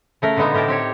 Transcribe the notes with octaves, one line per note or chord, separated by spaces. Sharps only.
C#3 A3 A#4
A#2 D3 G#3 B3 D#4
A2 G4 A#4 G5 A5
C4 G4 C#5